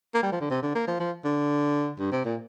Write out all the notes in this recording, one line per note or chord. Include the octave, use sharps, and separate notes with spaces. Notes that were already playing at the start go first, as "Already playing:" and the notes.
A#3
G3
F3
D3
C3
D3
A#3
F3
F3
D3
G2
C3
A#2